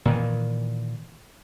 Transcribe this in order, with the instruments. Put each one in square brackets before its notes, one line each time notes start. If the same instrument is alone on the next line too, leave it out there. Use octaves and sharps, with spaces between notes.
[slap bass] A#2 D#3 E3